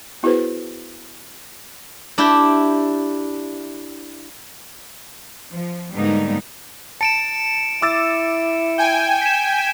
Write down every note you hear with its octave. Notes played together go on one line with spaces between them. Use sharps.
B3 E4 F#4 G#4 B4 C5
D4 E4 G4 G5
F3
G#2 D3 G3 A#3 B3 D#4
A5 C#7 D7 E7
E4 D6 E6 A6
G5 G#5
B6 E7